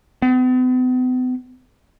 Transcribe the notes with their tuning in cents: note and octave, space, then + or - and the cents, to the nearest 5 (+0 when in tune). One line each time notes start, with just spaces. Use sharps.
B3 +45